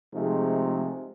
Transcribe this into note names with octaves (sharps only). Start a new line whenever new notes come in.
C3 F3 G#3 A3 D#4 G#4